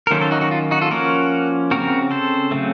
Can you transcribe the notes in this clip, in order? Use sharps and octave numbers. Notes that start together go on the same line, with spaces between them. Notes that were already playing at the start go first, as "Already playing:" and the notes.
A#4
D#3 F#3 A#3 C#4 A4 C5
A4 C5
D#4 F#4
D#4 F#4
F4
D#4 F#4
F4 A4
F3 A#3 C#4 F#4 A#4
C#3 F3 C4 F#4 A#4
A4 C5
C#3 F#3 A3 C4